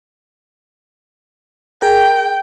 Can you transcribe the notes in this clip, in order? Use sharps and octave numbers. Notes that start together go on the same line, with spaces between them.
G#4 A#4 G5